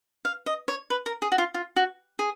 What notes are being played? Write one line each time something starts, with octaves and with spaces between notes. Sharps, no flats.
F5
D#5
C#5
B4
A#4
G#4
F#4
F4
F4
F#4
G#4